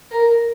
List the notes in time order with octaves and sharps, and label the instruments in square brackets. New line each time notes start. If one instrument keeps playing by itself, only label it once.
[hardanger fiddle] A#4